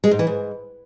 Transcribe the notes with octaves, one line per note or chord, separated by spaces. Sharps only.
G#3
G#2
E3
G#2